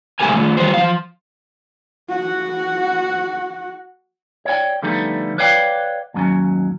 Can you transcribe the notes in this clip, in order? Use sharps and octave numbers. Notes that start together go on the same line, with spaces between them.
C3 G#3 A3 G4 A#4 G#5
D#3 F3 A3
D#3 G3 F#4 C5
F3 F5
F#4 F#5
C#5 D5 E5 G5
D3 F3 G3 A3 B3 D#4
B4 C#5 D5 F5 G5
D#2 G#2 F#3 C#4